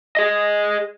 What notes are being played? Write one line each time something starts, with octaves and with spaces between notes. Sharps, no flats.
G#4 D#5